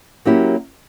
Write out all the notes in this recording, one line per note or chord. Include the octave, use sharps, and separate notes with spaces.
F#3 A#3 C#4 E4 G4